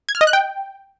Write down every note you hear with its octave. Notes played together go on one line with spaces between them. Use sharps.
G#6
F6
D#5
F#6
G5